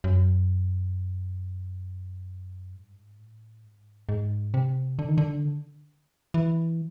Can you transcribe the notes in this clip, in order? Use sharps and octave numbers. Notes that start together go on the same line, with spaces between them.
F#2
G#2
G2
G#2
A2
G#2
G#2
C3
D3
D#3
D3
E3